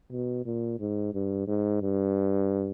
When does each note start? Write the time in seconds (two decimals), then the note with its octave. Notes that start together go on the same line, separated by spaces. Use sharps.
0.12 B2
0.45 A#2
0.79 G#2
1.14 G2
1.47 G#2
1.82 G2